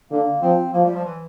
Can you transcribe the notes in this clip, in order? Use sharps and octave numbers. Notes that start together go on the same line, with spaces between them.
D3 A#3
F3 C4
F3 A#3
G3
F3
E3